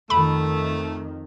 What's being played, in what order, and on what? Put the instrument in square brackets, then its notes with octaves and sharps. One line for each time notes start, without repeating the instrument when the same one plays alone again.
[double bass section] F2 D#3 [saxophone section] A3 [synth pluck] B5